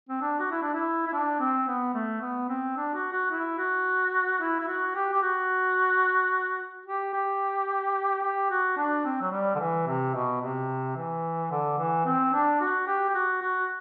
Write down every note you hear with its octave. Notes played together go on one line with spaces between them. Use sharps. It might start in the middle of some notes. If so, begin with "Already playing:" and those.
C4
D4
F#4
E4
D4
E4
E4
D4
C4
B3
A3
B3
C4
D4
F#4
F#4
E4
F#4
E4
E4
F#4
G4
G4
F#4
G4
G4
G4
F#4
D4
C4
F#3
G3
D3
E3
C3
B2
C3
E3
D3
E3
C4
D4
F#4
G4
G4
F#4
F#4